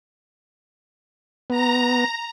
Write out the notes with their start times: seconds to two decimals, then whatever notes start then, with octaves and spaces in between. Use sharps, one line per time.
1.50 B3 A#5